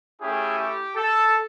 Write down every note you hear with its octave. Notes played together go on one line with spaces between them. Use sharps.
A3 C#4 E4 G4 G#4
G4
A4